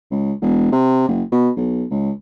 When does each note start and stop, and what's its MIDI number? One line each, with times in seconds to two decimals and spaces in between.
0.11 0.32 37
0.41 0.72 28
0.72 1.07 48
1.08 1.23 30
1.32 1.49 47
1.56 1.84 35
1.90 2.11 37